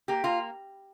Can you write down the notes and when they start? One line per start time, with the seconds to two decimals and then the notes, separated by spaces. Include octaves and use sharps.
0.08 A#3 G4
0.24 A#3 F4